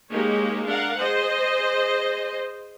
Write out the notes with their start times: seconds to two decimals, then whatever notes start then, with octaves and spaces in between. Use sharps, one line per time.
0.12 G#3 A#3 D#4 G4 C#5
0.66 D4 A#4 F5 F#5
0.99 G#4 C5 D#5